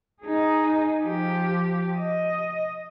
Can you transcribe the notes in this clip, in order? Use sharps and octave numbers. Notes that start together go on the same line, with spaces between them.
D#4 G#4
F3 G4
D#5